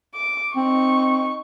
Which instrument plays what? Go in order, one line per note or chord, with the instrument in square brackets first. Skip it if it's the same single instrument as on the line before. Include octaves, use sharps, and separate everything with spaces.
[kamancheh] D6
[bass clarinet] C4 [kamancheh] D#4 C#6